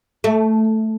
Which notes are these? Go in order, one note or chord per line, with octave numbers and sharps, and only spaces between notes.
A3